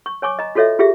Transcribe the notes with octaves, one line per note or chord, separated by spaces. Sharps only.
C#6
C#5 G#5 C#6 D6
D#5 A#5
F4 F#4 A4 C#5 D#5 E5
F4 G4 G#4 E5